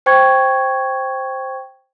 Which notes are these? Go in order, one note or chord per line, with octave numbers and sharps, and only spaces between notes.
C5 G5 C#6 G#6